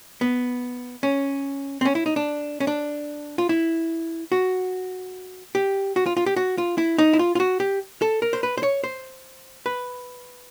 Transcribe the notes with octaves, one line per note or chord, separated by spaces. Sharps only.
B3
C#4
C4
C#4
E4
D#4
D4
C#4
D4
F4
E4
F#4
G4
F#4
F4
F4
G4
F#4
F4
E4
D#4
E4
F4
F4
F#4
G4
A4
A#4
C5
B4
C5
C#5
C5
B4